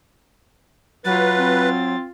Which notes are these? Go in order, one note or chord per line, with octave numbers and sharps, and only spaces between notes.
F#3 F4 B4 A6
C4